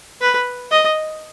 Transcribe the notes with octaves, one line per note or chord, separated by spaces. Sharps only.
B4
D#5